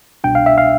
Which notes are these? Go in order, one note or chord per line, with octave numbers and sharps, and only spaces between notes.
C2 B2 G3 D4 G5
F5
E5
F5